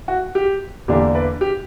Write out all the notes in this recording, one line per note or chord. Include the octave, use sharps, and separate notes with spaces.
F#4
G4
E2 D3 A#3 D4 G4
B4 D5
G4